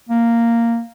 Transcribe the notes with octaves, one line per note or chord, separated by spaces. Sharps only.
A#3